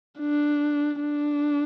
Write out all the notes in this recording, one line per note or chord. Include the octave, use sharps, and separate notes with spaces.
D4
D4